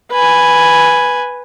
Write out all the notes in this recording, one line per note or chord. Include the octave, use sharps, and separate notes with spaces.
B4 G#5